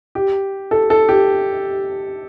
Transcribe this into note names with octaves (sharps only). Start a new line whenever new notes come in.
G4
A4
A4
G4